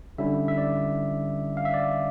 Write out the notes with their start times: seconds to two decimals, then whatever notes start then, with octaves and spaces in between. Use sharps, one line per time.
0.18 D3 G3 C#4 E4 E5
0.48 E5
0.58 D5
1.57 F5
1.65 E5
1.74 D5